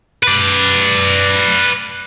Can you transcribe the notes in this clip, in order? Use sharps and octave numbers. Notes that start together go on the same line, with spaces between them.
B4 D5